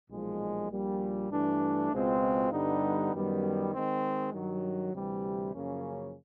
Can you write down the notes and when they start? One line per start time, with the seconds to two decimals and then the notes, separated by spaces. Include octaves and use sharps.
0.10 B1 A#2 F3 G#3
0.71 A#1 A#2 G3
1.31 G2 E3 A3 D4
1.92 C#2 B2 G#3 C4 F4
2.52 G2 D3 G3 B3 D#4
3.12 F#2 D#3 G3 B3
3.73 D#3 G#3 C4
4.33 G2 D#3 F#3
4.94 D2 C3 E3 G3
5.54 F#2 C#3 F3 A#3 C#4